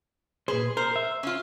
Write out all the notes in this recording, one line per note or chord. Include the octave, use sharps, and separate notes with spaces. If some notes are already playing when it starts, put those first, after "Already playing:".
A#2 G#4 B4 C5
A#4 C5
E5
C#4 F4